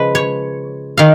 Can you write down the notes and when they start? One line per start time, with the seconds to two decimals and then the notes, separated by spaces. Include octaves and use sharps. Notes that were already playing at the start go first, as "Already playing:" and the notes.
Already playing: C#3 F3 G#3 B4
0.15 C#5
0.97 D#3 F5